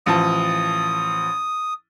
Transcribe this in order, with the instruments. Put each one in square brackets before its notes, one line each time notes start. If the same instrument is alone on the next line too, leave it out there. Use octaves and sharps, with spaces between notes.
[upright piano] A1 F3 A5 [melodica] D#6